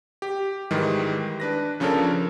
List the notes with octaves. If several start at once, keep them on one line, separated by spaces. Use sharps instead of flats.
G4
G#2 D#3 E3 G3 G#3
D4 B4 A#6
C#3 F3 C#4 D4 A4 A#4